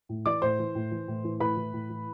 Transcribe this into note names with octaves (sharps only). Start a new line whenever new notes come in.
A2
E3 D5 D6
A2 C5 C6
E3
A2
E3
A2
E3
A2 B4 B5
E3
A2
E3